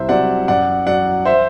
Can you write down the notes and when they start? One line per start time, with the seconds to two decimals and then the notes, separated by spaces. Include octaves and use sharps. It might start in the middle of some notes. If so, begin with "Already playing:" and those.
Already playing: C2 C5 E5
0.09 C3 F#3 D5 F#5
0.48 F#2 D5 F#5
0.87 F#3 D5 F#5
1.25 C5 E5